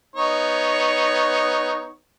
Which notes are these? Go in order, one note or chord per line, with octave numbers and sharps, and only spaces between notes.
B3 D#4 C#5